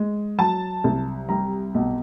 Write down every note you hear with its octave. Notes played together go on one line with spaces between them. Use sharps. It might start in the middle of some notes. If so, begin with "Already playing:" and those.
Already playing: G#3
F#3 A5
C2
G3 A#5
B1